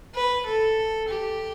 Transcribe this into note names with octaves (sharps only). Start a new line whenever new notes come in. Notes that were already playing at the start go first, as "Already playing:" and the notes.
B4
A4
G4